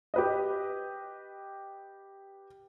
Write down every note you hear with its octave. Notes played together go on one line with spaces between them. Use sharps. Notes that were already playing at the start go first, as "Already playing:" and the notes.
G4 B4 D#5